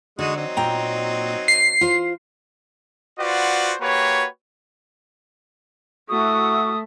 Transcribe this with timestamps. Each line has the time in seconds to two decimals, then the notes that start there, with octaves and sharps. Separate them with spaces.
0.19 D3 G#3 D#4 F#4
0.36 F#3 C4 D#4
0.57 A#2 G5 A#5
1.48 C7
1.81 F4 C5
3.20 F4 F#4 B4 C5 D5 F#5
3.81 A#3 F#4 G4 B4 C#5
6.09 A3 E4 F#4 C#6 D#6